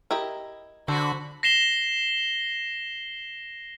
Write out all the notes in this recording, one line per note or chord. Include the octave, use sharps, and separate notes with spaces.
E4 G4 A#4 D#5
D3 F#4 A4 C5 B5
A#6 C7 E7 G7